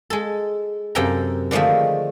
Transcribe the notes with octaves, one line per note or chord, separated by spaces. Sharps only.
G#3 A4
F#2 C3 A4 G5 A#5
D3 D#3 F3 G#3 A3